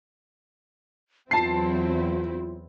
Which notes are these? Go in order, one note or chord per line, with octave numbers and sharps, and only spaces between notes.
E2 F#3 C4 E4 F4 A5 C7